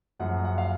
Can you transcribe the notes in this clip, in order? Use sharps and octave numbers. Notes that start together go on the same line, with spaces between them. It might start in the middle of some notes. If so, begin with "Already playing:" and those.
F#1 F#2 F3 F#5
F#5
F5